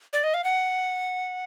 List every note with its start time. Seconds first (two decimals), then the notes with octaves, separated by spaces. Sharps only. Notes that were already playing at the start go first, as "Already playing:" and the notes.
0.13 D5
0.24 D#5
0.34 F5
0.44 F#5